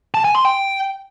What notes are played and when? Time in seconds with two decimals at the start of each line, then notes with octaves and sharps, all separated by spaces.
0.14 A5
0.25 G#5
0.35 C6
0.45 G5